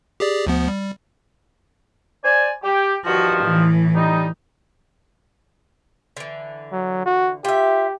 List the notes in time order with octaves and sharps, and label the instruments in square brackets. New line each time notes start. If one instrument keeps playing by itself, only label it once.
[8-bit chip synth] G4 G#4 D5
D2 F3 B3
G3
[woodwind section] C5 D5 G#5
G4
[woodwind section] G2 D#3 F3 [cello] F#4
[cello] A2 E3
[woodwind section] G3 D#4
[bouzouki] D3 E3
[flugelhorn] F#3
F#4
[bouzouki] F4 E5 [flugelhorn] G4